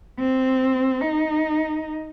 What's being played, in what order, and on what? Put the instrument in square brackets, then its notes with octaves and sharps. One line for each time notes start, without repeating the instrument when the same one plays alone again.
[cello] C4
D#4